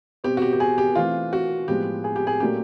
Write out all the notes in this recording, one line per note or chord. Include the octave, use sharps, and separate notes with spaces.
B2 G3 C4 G4
F#4
G4
G4
G#4
G4
E3 A3 C4 F4
F#4
A2 F3 G#3 B3 G4
G#4
G4
G#4
A#2 F#3 A3 C#4 G4